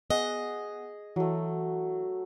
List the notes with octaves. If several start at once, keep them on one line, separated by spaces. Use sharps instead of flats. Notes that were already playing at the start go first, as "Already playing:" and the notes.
B3 G#4 D#5 F#5
E3 F#3 A3